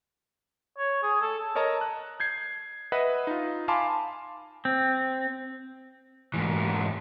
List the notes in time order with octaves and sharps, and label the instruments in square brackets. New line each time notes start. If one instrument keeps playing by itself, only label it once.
[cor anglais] C#5
G#4
A4
[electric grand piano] A#4 C#5 D#5 A5 A#5
F#6
G6 G#6 C7
B4 D#5 E5 F#5
D#4 F4
F5 G#5 A5 B5 C6 D6
[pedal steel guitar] C4
[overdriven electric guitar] G#2 E3